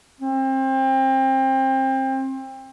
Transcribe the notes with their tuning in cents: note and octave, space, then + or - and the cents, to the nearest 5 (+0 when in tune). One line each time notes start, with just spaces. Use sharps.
C4 +25